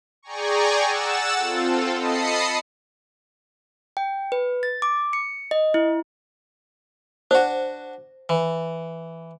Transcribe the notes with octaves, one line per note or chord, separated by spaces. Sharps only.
G#4 D5 G5 G#5 A#5 C#6
F#5 E6 A6 E7
C4 F4 A4
D#5 A5 B5 D#6 C7 C#7
G5
B4
A6
D6
C#7
D#5
E4
D4 F#4 C5
E3